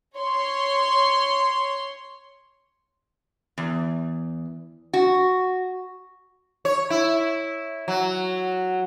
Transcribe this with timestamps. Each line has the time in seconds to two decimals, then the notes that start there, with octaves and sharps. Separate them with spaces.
0.17 C#5 C6
3.58 E2
4.93 F#4
6.65 C#5
6.90 E4
7.88 F#3